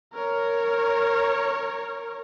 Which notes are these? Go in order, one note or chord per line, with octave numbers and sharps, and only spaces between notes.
A#4 C#5